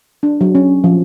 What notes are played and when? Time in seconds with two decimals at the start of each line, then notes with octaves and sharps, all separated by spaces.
0.23 D4
0.41 F#3
0.55 C#4
0.84 F3